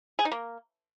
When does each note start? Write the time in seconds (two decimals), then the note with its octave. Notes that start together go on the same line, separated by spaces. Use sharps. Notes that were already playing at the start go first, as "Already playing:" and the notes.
0.19 G#4
0.25 D#4
0.32 A#3